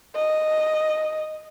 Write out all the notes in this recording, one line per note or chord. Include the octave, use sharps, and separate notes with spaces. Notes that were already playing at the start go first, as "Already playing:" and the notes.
D#5